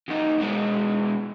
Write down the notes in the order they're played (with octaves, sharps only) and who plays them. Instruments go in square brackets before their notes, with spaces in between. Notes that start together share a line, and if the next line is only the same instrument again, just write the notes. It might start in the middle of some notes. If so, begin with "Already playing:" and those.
[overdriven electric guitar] E2 D#4
B2 G#3